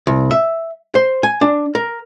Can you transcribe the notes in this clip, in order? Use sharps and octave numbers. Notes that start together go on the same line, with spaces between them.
C2
E5
C5
G#5
D4
A#4